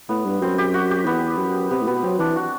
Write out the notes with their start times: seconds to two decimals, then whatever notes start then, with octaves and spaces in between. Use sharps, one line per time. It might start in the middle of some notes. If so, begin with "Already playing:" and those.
0.09 A2 B3
0.25 G2
0.41 F#2 C4
0.58 G4
0.74 F#4
0.91 G4
1.06 E2 B3
1.38 F#2
1.71 C3 B3
1.81 A2
1.87 B2 B3
2.03 F#3 C4
2.19 E3 D4
2.36 F#4